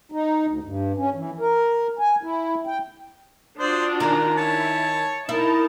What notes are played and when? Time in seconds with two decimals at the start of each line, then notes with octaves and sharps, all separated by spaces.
0.12 D#4
0.46 D2
0.64 G2
0.97 C#4
1.15 E3
1.40 A#4
1.99 G#5
2.23 E4
2.67 G5
3.59 D4 F4 F#4 C5 D5 D#6
4.00 D#3 G#3 A#5
4.36 E4 C#5 A5
5.29 D#4 E4 A#4 A5